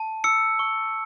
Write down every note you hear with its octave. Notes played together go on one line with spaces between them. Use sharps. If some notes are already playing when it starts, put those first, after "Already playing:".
Already playing: A5
E6 C#7
C#6